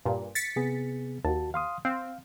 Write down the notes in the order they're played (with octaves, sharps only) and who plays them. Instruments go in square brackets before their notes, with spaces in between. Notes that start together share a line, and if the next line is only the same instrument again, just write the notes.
[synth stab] G2 A#2
A6 B6 C#7
[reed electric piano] C3 B3 G#4
[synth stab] D#2 [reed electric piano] F#4 A5
[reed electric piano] F5 C6 D#6
[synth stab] C4 [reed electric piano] F5